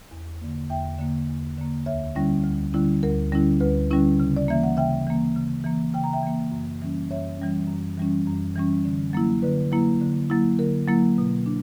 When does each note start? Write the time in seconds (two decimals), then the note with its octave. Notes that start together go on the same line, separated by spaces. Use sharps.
0.11 E2
0.41 D3 A#3
0.70 E2 E5 G5
0.99 D3 A#3
1.29 E2
1.58 D3 A#3
1.86 D2 C#5 E5
2.15 D3 G3 C#4 E4
2.44 D2
2.73 D3 G3 C#4 E4
3.03 D2 A#4
3.32 D3 G3 C#4 E4
3.60 D2 B4
3.91 D3 G3 C#4 E4
4.20 C#3
4.36 D5
4.48 E3 A#3 E5
4.63 F#5
4.77 C#3 E5 G5
5.07 E3 A#3
5.36 C#3
5.64 E3 A#3
5.94 C#3 G5
6.04 A#5
6.13 E5 G5
6.23 E3 A#3
6.52 F#2
6.82 E3 G3 C#4
7.10 F#2 C#5 E5
7.39 E3 G3 C#4
7.68 F#2
7.97 E3 G3 C#4
8.26 F#2
8.55 E3 G3 C#4
8.85 D3
9.13 F#3 A#3 E4
9.42 D3 B4
9.72 F#3 A#3 E4
10.01 D3
10.30 F#3 A#3 E4
10.59 D3 A#4
10.88 F#3 A#3 E4
11.18 B2
11.46 D4